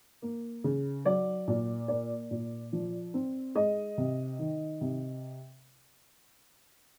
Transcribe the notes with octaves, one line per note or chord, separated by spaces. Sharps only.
A#3
C#3
F#3 D5
A#2
A#3 D5
A#2
F3
C4
G#3 D#5
C3
D#3
C3